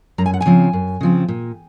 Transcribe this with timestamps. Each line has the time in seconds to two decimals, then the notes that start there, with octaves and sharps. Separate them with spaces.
0.18 F#2 A#5
0.26 G#5
0.34 F#5
0.41 G#5
0.46 C#3 F3 C4
0.73 F#2
1.01 C#3 F3 C4
1.28 A#2